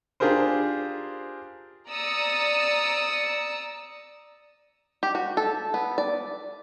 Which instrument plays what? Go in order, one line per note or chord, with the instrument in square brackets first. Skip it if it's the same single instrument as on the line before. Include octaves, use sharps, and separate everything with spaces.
[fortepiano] D4 F4 G4 G#4 A#4 C5
[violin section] D5 A#5 D#6 E6 C#7
[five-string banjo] G4
F#4
A4
B3
D5